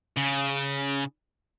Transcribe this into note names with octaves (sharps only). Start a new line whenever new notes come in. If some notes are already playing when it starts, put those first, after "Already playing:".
C#3